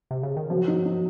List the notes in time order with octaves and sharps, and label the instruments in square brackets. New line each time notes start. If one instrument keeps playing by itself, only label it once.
[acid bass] C3
C#3
D#3
[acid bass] F3 [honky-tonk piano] F#3
[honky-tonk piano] D#4
D#4